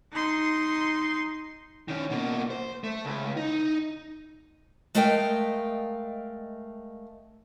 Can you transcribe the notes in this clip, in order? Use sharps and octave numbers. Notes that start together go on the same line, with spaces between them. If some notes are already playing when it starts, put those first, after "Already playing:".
D#4 C6
D#3 C#4
B2 A#3
C5
A3
C#2
D#4
G#3 A3 A#4 D#5 F5 G5